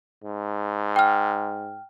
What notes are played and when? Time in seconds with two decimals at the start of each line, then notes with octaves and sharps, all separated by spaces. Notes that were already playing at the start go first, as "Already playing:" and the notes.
0.24 G#2
0.96 G5 F6